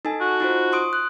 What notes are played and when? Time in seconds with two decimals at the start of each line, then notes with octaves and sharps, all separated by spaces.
0.05 D#4 A4 G#5
0.21 F#4
0.40 D#4 F4 C5
0.72 C6 D#6 D7
0.93 F#6